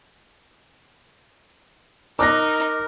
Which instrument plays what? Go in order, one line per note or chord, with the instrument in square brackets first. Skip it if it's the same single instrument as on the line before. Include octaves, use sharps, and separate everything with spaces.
[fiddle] D#4 [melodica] A#4 [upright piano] D6 F#6 A#6